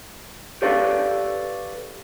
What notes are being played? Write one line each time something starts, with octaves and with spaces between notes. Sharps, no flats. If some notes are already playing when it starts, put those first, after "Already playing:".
G4 A4 B4 C#5 D5 F5